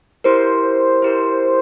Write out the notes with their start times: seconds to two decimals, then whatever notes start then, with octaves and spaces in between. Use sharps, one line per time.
0.24 E4 G4 A#4 C5
1.02 E4 G4 A#4